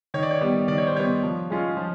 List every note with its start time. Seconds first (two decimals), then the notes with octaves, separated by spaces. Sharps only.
0.14 D#3 C#5
0.23 D5
0.31 C#5
0.41 G3 B3
0.68 D#3 D5
0.78 C#5
0.87 C5
0.95 G3 B3 C#5
1.23 F3
1.50 G#3 C#4 F4
1.77 F3